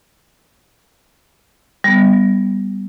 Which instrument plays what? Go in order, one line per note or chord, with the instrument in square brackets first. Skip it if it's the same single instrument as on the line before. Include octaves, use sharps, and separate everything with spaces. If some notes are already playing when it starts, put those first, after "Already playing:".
[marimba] G3 B3